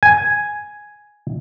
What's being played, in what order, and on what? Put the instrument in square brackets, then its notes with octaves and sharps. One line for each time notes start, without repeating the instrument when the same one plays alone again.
[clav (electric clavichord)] G#5